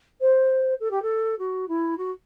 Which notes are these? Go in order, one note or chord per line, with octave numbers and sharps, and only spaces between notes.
C5
A4
G4
A4
F#4
E4
F#4